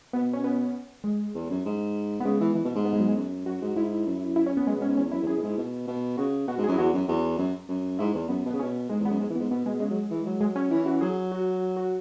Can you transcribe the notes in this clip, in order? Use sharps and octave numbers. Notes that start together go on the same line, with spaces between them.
B2 B3
C#4
B3
G#3
E2
F#2
G#2
B3
C#3 G#3
E3
E3
B2
G#2
B3
G#3
F#3
G#3
F#2
F#2 F#4
G#2
G#2 E4
F#2
E4
C#4
B3
F#2 G#3
B2
C#4
G#2
E2 C#4
F#2 E4
E2
F#2 G#4
B2
G#2
B2
B2
C#3 F#4
B2 F#4
G#2
G#4
F#2
E4
E2 F#4
F#2
E2 F#4
F#2
F#2
G#2 E4
E2
F#2 B3
B2
C#3 B3
B2 C#4
G#2 G#3
E2
B3
F#2
G#2 G#3
E3
B3
G#2
B2 B3
B2 G#3
C#3 G#3
F#3
E3
F#3
G#3
C#4
E3 E4
F#4
F#3 G#4
F#4
F#4